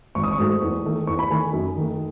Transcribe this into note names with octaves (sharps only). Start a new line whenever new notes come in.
G#1 C#6
D#6
C#6
G#2 F#3 A3
E2
D#3 A3
E2 C#6
B5
D#3 A3 G#5
F#2
D#3 A3